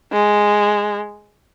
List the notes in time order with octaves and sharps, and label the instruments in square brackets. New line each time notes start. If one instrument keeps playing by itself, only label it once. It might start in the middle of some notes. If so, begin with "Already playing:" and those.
[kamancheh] G#3